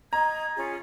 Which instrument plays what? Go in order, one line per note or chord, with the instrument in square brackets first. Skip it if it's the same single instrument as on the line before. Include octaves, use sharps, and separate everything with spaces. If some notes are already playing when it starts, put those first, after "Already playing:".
[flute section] D#5 G#6 [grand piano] A#5
[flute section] C#4 F4 G#4